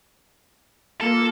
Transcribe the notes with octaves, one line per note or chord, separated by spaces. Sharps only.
A#3 F4 A4